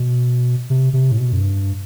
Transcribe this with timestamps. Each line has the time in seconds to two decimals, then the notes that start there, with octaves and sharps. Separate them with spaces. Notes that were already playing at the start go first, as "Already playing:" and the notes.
Already playing: B2
0.70 C3
0.93 C3
1.12 A2
1.18 B2
1.33 F#2
1.41 G2